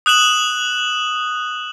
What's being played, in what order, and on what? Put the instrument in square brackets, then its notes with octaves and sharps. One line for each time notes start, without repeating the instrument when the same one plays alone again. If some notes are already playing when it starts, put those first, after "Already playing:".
[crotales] D#6 F#6 E7 F#7